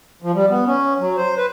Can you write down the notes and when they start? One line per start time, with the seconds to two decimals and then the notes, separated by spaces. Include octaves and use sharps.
0.22 F3
0.34 G3
0.50 B3
0.66 C#4
1.00 F#3
1.17 C5
1.38 B4